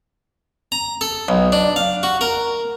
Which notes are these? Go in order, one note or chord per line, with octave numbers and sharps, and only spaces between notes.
A#5
A4
B1
D4
F5
F#4
A#4